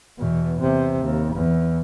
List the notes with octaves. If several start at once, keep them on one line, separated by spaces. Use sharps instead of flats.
E2 B2
E2 C3
D#2
E2